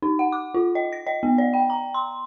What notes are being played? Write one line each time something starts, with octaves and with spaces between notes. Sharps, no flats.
D#4
F#5
D6
F4
D#5
A#6
D#5
B3
D5
G5
A#5
C6